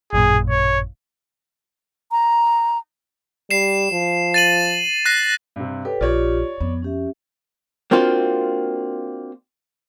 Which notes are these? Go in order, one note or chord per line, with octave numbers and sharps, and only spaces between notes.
A1 F#2 A#2 G#4
C#5
A#5
G3 C7 E7
F3
A6 D#7 F#7
F#6 A#6 C7
G2 C3
G4 A4 B4 C#5
A#1 F4 G4 C#5 D5
F2 B3
C#4 G4 E5
A#3 C4 D4 F4 F#4